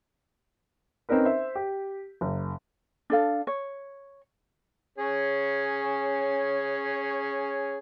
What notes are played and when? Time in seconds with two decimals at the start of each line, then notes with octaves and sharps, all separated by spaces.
1.09 C4 C#4 D#4 A#4 B4
1.25 C5 E5
1.55 G4
2.21 F#1
3.10 D4 A4 F5
3.47 C#5
4.98 C#4 G#4 C#5